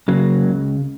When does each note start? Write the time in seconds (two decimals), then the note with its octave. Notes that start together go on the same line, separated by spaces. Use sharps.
0.08 C#3 F#3 A#3
0.44 C#2